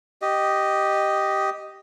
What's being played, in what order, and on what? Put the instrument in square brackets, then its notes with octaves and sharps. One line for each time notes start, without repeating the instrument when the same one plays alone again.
[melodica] G4 D#5